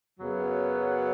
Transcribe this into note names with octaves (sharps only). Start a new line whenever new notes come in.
F#2 C#3 F#3 B3